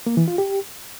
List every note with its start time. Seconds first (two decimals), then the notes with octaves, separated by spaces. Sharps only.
0.06 A#3
0.17 E3
0.28 F4
0.38 G4